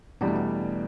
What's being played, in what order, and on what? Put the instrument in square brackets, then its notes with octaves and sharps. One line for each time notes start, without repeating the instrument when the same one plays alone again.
[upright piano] E2 B2 G3 D4 [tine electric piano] B3
[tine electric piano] A3
B3